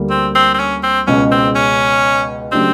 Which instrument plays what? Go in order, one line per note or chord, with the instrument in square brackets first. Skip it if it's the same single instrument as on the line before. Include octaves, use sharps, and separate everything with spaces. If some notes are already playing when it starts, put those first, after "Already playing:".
Already playing: [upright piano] D2 D3 G3 A#3
[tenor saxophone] C4
C4
C4
C#4
C4
[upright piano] C#2 B2 G#3 [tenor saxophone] C#4
[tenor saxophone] C4
C#4
[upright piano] C#3 F#3 A3 D4 G4 [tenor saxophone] C4